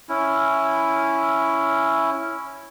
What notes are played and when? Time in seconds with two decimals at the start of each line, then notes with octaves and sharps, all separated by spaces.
0.09 C#4 E4